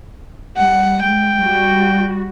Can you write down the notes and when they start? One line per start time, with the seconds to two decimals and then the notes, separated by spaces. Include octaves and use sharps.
0.57 G3 F#5
1.02 G#3 G5
1.38 G3 F#4